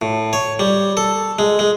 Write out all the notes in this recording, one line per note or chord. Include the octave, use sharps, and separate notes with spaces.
A2
C#5
G3
A4
G#3
G#3